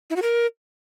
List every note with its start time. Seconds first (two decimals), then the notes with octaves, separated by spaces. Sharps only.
0.10 E4
0.16 F#4
0.22 A#4